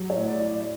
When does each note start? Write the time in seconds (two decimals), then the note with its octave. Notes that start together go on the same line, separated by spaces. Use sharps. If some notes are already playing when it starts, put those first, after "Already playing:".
Already playing: F#3
0.10 C#5
0.16 A2
0.28 D5
0.39 A2
0.45 D5